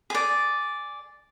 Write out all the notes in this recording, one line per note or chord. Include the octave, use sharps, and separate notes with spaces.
G#4 D5